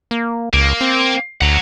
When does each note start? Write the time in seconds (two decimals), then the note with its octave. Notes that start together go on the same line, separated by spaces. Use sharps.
0.11 A#3
0.53 C#2 A#3
0.81 C4
1.41 D2 F#5 A#5